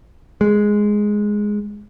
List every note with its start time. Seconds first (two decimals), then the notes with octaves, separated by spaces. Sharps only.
0.41 G#3